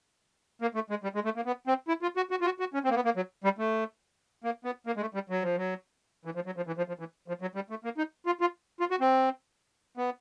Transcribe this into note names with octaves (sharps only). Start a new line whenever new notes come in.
A#3
A3
G#3
G3
G#3
A3
A#3
B3
C4
E4
F4
F#4
F#4
F4
F#4
F#4
C#4
C4
A#3
B3
A#3
F#3
G3
A3
A#3
B3
A#3
G#3
A3
G3
F#3
F3
F#3
E3
F3
F#3
F3
E3
F3
F3
E3
F3
F#3
G3
A3
A#3
D#4
F4
F4
F4
F#4
C4
B3